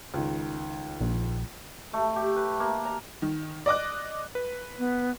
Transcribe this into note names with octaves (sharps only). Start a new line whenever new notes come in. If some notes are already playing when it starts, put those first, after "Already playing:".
C#2 D#3
A#1
A3
G4
B4
A#3
A#5
D#3
D5 D#5 D6 F#6
B4
B3